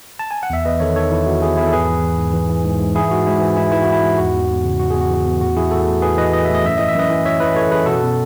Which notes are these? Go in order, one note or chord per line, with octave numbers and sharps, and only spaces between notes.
A5
G#5
F#5
E2 E5
E2 B4 D#5
D#3 A4 C#5
D#3 A4 C#5
E2 E4
E2 F#4
E2 E4 G#4
E2 E4 G#4
A4
G#2 G#4 B4
E3
E3
G#2
E3
E3
G#2
G#2
E3 E4 G#4
G#2 F#4
G#2 E4
E3
G#2 E4
E3 E4
G#2 F#4
E4
G#2
E2 F#4
E2
E2
C#3
E3 F#4
E2 G#4
F#4
E3
E2
A2 F#4
E3 E4 G#4
A2 F#4 A4
A2
A2 G#4 B4
E3 B4 D#5
E3 D#5
A2 E5
D#5
F#2 E5
E3 D#5
E5
F#2 B4 D#5
E3
E3 C#5 E5
E3 B4 D#5
E3 A4 C#5
F#2 G#4 B4
B2 F#4 A4
B2